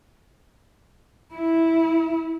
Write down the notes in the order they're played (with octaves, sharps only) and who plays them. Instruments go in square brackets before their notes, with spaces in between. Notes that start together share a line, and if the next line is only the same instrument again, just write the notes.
[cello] E4